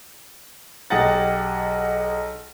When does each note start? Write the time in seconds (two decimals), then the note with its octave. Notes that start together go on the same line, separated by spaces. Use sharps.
0.90 B1 G4 G#4 D#5 F#5 A6